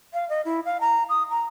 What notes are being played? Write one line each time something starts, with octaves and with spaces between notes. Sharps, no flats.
F5
D#5
E4
F5
A#5
D#6
A#5